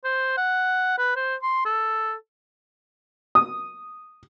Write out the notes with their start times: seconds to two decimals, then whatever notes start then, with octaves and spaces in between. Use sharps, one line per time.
0.05 C5
0.37 F#5
0.98 B4
1.16 C5
1.42 C6
1.65 A4
3.35 D#6